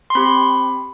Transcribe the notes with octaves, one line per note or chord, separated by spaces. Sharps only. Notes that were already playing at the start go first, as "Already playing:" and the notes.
C6
C4 G4 B5